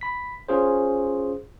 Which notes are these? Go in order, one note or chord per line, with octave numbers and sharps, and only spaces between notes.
B5 B6
C#4 F4 G#4 C5